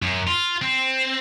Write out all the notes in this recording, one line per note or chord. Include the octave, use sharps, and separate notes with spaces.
F#2
F4
C4